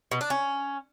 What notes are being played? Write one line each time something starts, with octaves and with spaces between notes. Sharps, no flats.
B2
D4
C#4